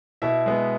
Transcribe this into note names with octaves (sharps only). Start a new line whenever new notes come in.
B2 E4 E5
G#3 B3